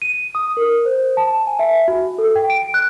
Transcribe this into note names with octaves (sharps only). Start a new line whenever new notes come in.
D#7
D#6
A#4
C5
A5
G#5
E5
F#4
A4
G5
D7
F#6